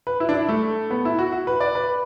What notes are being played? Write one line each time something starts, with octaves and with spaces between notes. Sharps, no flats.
B4
E4
D4
E4
A3
B3
E4
F#4
F#4
B4
D5
B4